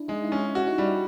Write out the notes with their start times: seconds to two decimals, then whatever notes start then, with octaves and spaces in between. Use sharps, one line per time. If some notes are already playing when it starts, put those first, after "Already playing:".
Already playing: D4 E4
0.08 G#3 D#4
0.24 E4
0.32 C#4
0.39 E4
0.55 E4 F#4
0.67 D#4
0.78 G3 E4